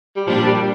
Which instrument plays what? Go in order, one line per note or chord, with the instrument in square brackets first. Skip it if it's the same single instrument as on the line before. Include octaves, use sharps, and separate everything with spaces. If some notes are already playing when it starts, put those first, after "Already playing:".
[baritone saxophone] G3
[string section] A#2 G3 D4 [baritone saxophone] F3
[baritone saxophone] G3